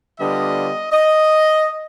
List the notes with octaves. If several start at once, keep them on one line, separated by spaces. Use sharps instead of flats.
D3 G3 B3 D4 F4 D#5
D#5